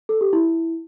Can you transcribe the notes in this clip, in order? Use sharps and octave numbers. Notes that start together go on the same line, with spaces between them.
A4
G4
E4